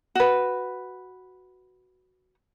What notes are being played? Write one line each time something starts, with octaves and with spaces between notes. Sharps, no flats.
F#4 B4